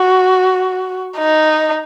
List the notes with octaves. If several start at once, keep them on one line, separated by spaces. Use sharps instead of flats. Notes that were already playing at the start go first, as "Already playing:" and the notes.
Already playing: F#4
D#4